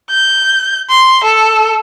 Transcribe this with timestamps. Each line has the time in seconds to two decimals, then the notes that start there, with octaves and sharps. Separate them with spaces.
0.10 G6
0.89 C6
1.24 A4